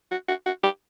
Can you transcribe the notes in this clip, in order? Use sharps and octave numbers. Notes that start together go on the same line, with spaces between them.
F#4
F#4
F#4
G4